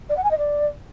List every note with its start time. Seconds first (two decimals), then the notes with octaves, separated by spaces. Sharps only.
0.09 D5
0.16 F#5
0.23 G#5
0.30 D#5
0.38 D5